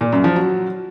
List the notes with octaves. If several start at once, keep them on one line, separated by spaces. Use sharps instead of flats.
A#2
F#2
F3
F#3